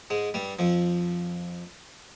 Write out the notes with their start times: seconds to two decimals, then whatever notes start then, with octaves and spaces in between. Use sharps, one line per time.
0.10 G#2 G#3
0.34 G2 G3
0.59 F2 F3